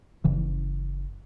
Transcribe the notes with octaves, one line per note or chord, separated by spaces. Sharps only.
F#1 C#3 E3